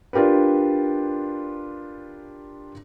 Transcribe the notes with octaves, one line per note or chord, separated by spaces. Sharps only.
D4 F4 G4 A#4 B4